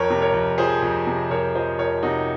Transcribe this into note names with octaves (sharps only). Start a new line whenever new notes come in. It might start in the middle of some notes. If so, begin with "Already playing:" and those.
Already playing: F2 A#4 C#5
C3
A#4 C#5
F2
F3 G#4 C5
F2
C3
F2 A#4 C#5
F3 C5 D#5
F2 A#4 C#5
C3 D#4 F#4